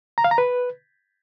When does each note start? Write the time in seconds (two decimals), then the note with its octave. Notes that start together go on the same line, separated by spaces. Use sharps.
0.18 A#5
0.24 F5
0.31 A#5
0.38 B4